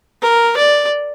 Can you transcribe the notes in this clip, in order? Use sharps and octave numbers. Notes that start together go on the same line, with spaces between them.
A#4
D5